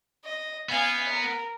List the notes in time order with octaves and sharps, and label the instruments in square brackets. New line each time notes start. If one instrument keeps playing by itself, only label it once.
[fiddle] D#5
[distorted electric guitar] B3 [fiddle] F5 G#5
[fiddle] A#4